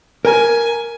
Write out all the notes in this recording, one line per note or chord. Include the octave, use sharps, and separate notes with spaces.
A#4 G#5 A#5